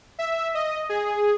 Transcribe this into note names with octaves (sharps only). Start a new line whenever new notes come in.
E5
D#5
G#4